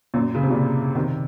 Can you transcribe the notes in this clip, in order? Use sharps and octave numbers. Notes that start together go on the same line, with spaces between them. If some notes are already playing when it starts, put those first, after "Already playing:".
F#2 A#2
C#3
C3
A#2 C#3
C3 D#3